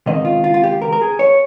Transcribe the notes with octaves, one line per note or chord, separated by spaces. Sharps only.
C#2 C3 D#3 D#5
F4
F4
F4
G4
A#4
A#4
G#4
C#5